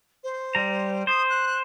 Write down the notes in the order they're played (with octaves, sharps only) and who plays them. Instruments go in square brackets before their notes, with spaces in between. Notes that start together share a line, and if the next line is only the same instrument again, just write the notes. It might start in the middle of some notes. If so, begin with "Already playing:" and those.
[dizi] C5
[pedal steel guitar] G3 A#5
[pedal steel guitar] C5 [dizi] D#6
[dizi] F#6